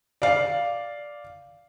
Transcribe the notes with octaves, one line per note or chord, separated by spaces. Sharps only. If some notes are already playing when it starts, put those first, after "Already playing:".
D5 F5